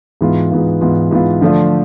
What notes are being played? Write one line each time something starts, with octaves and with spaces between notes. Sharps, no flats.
G#2 E3 B3 F4
G#2 E3 B3 F4
G#2 E3 B3 F4
G#2 E3 B3 F4
D3 F3 A3 D4 F4